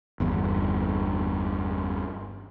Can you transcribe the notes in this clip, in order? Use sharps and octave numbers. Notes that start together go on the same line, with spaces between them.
G1 E2 G2